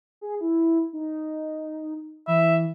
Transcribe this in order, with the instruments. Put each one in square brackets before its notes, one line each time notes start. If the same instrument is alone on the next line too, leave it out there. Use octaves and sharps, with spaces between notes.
[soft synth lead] G#4
E4
D#4
[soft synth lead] E3 [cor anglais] E5